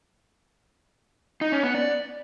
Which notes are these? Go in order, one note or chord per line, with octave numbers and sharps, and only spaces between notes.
D#4
C#4
B3
D5